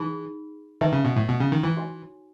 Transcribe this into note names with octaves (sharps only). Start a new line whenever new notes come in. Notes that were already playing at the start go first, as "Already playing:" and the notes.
Already playing: E3 D#4 G#4 B5
D#3 B4 E5 A5
C#3
B2
A2
B2
C#3
D#3
E3
D#4 F#4 C#5 G#5